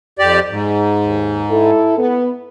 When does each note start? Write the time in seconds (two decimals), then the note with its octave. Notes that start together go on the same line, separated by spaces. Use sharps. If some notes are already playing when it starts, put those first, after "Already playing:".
0.19 F2 G4 D5
0.50 G#2
1.05 D#2
1.50 E4 A4
1.98 B3